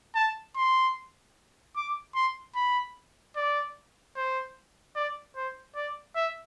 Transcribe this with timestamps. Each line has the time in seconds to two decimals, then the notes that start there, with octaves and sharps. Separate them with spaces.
0.15 A5
0.56 C6
1.76 D6
2.15 C6
2.55 B5
3.36 D5
4.16 C5
4.96 D5
5.36 C5
5.76 D5
6.15 E5